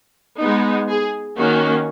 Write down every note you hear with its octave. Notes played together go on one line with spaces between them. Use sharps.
G#3 B3 D#4
G#4
D#3 A#3 C#4 F#4